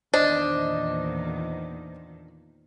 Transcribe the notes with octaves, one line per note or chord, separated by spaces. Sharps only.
E2 A#2 D#3 D4 C5 D#5